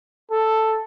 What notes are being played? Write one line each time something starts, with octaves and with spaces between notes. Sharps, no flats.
A4